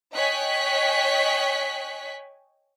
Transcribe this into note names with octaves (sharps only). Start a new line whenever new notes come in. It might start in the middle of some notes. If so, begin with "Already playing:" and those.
C#5 D#5 G5 G#5 F#6 B6